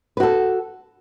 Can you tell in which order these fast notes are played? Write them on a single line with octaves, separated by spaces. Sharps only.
B4 F#4 A4